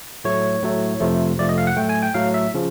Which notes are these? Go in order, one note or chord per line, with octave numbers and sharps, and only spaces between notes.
A2 F#3 A3 C#5
A2 F#3 A3
F2 C3 F3 A3
F2 C3 F3 A3 D5
D#5
F5
F#5
A2 F#3 A3 G5
G#5
G5
A2 F#3 A3 F5
E5
C#3 F3